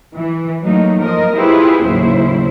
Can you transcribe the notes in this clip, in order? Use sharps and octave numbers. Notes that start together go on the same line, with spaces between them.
E3
F#3 A3 A#3 D#4
F3 A#4 D#5
E4 F4 G4 G#4 B4 C5
D#2 A2 C#3 F#3 E4 C5